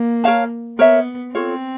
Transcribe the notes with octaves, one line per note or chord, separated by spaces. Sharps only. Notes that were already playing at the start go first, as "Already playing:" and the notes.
Already playing: A#3
A#4 C#5 F5 A5
B3 A#4 C#5 E5
C4 F4 A4 C#5